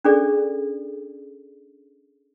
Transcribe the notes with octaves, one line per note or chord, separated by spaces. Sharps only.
C#4 D4 G#4 A4 D5